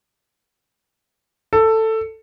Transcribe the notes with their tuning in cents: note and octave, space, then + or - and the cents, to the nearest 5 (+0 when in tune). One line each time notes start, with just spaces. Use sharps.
A4 +10